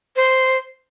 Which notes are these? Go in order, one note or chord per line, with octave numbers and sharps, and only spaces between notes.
C5